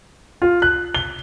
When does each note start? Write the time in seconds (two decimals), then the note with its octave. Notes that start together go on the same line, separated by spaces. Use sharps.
0.42 F4
0.62 F#6
0.95 G7